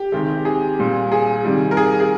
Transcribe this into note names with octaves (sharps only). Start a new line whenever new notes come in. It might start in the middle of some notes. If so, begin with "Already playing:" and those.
Already playing: G4
C3 D#3 G#3 C4
G#4
A#2 G3 C4
G#4
C3 D#3 G3
A#4
G#4
G#4